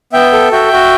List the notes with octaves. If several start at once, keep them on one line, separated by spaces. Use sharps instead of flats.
B3 E5 G5
A4
F#4 E5 G5
F#4